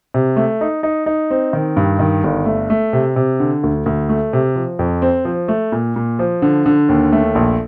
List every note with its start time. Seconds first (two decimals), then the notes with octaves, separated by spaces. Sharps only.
0.14 C3
0.36 A3
0.61 D#4
0.83 D#4
1.06 D#4
1.30 C4
1.53 D#3
1.77 G2
1.99 D#3
2.24 G1
2.46 A3
2.70 A3
2.93 C3
3.16 C3
3.40 D3
3.63 D2
3.86 D2
4.09 A3
4.33 C3
4.56 F3
4.79 F2
5.02 C4
5.25 F3
5.48 A3
5.72 A#2
5.96 A#2
6.19 F3
6.42 D3
6.66 D3
6.89 D#2
7.12 A3
7.35 A#1